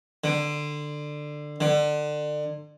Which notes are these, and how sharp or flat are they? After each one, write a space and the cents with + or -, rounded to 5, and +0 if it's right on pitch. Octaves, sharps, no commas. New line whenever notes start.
D3 +15
D3 +30